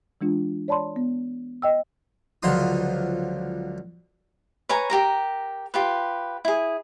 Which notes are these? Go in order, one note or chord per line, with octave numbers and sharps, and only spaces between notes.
E3 G#3 D4 F4
C#5 D5 A5 B5 C6
B3
D#5 G5 E6
C#2 D3 F3 F#3 C6 D#6
B4 C#5 G#5 A#5
G4 A#4 A#5
F4 G4 B4
E4 G#4